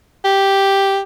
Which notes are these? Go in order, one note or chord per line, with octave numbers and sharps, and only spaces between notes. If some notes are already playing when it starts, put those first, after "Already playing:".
G4